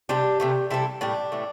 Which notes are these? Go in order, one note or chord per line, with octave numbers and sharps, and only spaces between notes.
C3 G3 D4 G4
C3 E3 A3
C3 G3 E4 A4
A2 G3 D4
A2 E3 A3